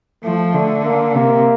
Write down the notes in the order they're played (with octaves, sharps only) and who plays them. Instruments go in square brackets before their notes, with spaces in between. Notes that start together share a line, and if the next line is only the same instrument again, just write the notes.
[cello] F3 [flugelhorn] A3
[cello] D3 [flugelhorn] A3
[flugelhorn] A#3
[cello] C3 [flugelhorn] A#3